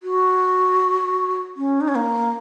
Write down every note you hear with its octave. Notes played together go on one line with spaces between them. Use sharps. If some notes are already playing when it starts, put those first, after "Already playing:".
F#4
C#4
D#4
C#4
A#3